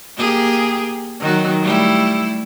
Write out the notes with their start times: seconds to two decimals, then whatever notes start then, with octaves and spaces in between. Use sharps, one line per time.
0.17 A#3 G4 G#4
1.20 D#3 F#3 F#4
1.62 G3 A3 E4